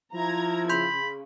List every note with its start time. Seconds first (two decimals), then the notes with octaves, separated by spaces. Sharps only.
0.14 F3 E4 A#5 G#6
0.69 C#3 B5 C6 G6